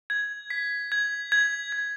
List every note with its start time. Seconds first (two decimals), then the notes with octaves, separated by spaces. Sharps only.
0.10 G#6
0.50 B6
0.92 G#6
1.32 G#6
1.72 G#6